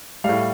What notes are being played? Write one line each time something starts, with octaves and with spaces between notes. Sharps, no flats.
A2 G3 F5